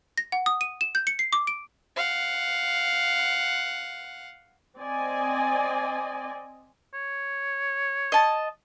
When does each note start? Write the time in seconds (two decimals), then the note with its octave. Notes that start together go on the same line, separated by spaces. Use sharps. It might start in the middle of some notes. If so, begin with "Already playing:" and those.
0.18 A#6
0.32 F#5
0.46 D#6
0.61 D#7
0.81 E7
0.95 G6
1.07 C#7
1.19 C7
1.33 D6
1.47 D7
1.96 F5 F#5
4.78 C4 D5 D#5 G#5
6.94 C#5
8.12 D#5 A5